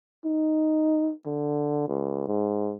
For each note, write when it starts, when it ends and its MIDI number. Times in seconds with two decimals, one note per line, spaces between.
0.25 1.12 63
1.26 1.85 50
1.88 2.26 37
2.28 2.77 44